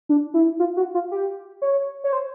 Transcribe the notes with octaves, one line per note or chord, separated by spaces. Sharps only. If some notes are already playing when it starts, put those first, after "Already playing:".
D4
E4
F4
F#4
F4
G4
C#5
C#5
C5